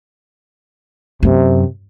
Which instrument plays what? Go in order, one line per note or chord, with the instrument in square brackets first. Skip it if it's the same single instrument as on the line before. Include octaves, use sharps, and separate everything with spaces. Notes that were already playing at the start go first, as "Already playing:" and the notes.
[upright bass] F#2 [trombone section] C3